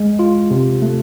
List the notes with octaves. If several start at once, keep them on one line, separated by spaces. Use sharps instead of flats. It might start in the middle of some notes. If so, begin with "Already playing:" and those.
Already playing: G#3
F4
C3
A3